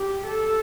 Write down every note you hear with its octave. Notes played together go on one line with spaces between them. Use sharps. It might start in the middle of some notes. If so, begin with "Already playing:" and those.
Already playing: G4
A4